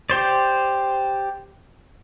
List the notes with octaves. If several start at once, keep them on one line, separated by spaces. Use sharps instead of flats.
G4 C5 D5